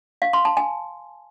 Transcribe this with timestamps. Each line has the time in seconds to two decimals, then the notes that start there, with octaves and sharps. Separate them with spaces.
0.22 F5
0.33 C6
0.45 A5
0.57 G#5